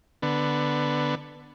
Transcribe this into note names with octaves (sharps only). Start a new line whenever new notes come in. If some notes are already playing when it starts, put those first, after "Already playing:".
D3 B3